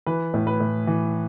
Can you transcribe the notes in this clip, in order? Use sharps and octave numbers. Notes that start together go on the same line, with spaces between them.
E3 B4
A2
B4
A2
E3